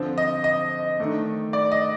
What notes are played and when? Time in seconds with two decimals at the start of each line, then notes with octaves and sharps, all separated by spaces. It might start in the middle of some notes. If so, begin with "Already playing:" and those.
Already playing: D3 F3 C4
0.18 D#5
0.44 D#5
1.00 D#3 A3 D4
1.53 D5
1.72 D#5